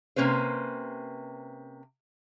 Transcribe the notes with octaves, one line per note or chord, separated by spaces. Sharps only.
C3 A#3 C#4 B4 C5